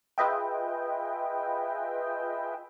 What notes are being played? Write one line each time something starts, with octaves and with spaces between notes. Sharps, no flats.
F4 G#4 B4 D#5 E5 G5